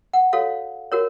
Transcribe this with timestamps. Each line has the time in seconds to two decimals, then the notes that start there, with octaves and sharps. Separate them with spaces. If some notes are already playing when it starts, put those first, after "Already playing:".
0.13 F#5
0.33 F#4 A4 C#5 F5
0.92 F#4 A#4 C#5